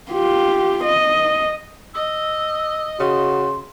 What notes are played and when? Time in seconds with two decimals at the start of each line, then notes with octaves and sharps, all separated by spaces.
0.11 F4 G4
0.85 D#5
1.94 D#5 E6
3.00 C#3 F#4 C6